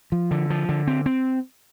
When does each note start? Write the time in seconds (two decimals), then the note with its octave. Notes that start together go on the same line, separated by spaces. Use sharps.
0.12 F3
0.31 D3
0.50 F3
0.69 D3
0.87 C4
1.06 C4